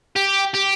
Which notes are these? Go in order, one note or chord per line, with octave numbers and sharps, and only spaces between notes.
G4
G4